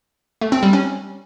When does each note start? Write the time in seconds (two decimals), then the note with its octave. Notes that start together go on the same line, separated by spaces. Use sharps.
0.41 A3
0.52 C4
0.63 G3
0.73 C#4